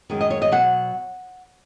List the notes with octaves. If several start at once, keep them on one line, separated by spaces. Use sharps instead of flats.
F#2 D#3 G#3
D#5
C#5
D#5
B2 F#3 F#5